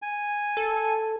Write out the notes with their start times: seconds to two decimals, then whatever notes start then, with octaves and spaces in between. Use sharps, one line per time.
0.02 G#5
0.57 A4